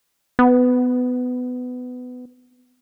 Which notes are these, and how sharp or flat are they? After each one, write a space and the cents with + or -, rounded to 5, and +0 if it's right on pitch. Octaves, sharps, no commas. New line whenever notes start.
B3 +20